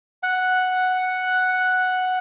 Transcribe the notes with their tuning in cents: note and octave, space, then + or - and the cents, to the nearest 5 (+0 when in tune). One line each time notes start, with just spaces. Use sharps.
F#5 +0